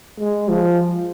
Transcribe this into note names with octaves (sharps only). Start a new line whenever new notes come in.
G#3
F3